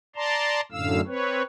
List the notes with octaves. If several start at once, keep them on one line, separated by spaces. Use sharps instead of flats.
D5 A5 A#5 C6
F#2 A2 D3 F5 E6
C4 B4 C#5